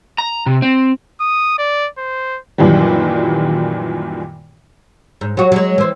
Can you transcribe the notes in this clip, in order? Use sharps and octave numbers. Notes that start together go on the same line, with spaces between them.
A#5
C3
C4
D#6
D5
C5
F#2 A#2 D#3 E3 F#3 G3
G#2
F#3 F#4
F#3 G#3
E3 C4